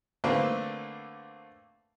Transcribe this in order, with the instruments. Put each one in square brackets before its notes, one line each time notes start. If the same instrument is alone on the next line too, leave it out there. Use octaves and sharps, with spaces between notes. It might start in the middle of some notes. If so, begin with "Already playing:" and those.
[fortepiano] D3 A3 A#3 C4 D4 B4